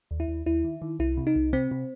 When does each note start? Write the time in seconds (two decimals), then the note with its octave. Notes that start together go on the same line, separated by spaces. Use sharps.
0.11 D#2
0.20 E4
0.28 D#2
0.46 D#2 E4
0.64 D#3
0.82 D#3
0.99 C2 E4
1.17 C3
1.27 D#4
1.36 C2
1.53 C3 C4
1.71 C3